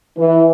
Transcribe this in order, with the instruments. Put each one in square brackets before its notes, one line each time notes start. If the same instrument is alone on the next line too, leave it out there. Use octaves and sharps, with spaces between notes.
[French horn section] E3